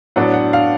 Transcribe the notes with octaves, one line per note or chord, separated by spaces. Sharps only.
A2 F#3 B3 D4 F#5
F#5
F5